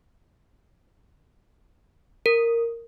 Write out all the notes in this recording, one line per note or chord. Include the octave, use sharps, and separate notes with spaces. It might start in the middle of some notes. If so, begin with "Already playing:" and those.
A#4